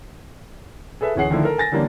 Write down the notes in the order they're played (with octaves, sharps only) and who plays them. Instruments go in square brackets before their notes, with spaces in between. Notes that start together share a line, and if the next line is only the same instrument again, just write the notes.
[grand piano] G#4 A4 B4 E5
D1 E3 C#4 G#4 F#5 C7
D3 D#3 F3 A3 D4 E4
A4 A#4
G#5 A6 A#6
D3 E3 G3 A#3 C#4 D4